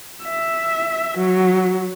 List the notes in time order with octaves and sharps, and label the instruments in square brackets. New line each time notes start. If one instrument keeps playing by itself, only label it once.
[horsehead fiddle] E5
F#3